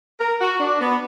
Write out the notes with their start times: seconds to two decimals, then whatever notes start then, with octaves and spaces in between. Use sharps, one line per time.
0.19 A#4
0.41 F#4
0.60 D4
0.81 B3